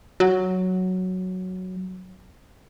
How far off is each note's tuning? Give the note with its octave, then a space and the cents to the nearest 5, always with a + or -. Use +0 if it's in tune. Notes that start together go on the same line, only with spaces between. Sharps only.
F#3 +0